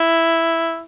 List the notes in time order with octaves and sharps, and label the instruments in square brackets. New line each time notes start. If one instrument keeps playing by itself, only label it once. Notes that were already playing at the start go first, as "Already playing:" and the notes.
Already playing: [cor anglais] E4